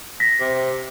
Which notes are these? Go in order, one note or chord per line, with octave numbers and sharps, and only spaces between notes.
A#6 B6
C3